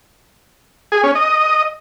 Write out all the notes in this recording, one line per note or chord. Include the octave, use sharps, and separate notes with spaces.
G#4
C#4
D#5